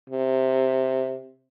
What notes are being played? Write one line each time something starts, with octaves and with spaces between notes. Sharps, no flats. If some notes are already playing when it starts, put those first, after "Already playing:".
C3